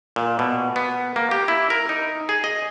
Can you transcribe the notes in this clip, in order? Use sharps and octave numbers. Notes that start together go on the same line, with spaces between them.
A#2
B2
B3
A#3
G4
E4
A#4
D#4
G#4
D#5